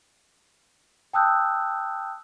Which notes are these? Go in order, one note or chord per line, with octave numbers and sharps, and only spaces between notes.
G5 A5 D#6 E6 F#6 G6